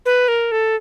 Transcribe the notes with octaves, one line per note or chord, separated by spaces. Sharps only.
B4
A#4
A4